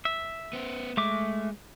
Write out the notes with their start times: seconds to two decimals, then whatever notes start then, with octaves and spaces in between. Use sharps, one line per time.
0.05 E5
0.53 B3 C5
0.97 G#3 A3 E5 D6